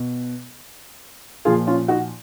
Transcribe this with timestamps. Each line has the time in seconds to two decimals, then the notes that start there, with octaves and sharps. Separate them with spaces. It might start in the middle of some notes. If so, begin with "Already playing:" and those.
Already playing: B2
1.45 A#2 F3 F4 G#4
1.67 C#4 F4
1.88 D#4 F#4